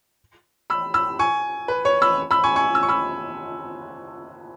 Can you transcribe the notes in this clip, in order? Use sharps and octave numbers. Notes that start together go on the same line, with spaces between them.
B5 E6
B5 E6
G#5 C#6
B4
C#5
B5 E6
B5 E6
G#5 C#6
G#5 C#6
E6
C#6
B5 E6